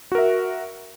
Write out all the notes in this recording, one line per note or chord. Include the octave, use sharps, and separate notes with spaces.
F#4 A#4 E5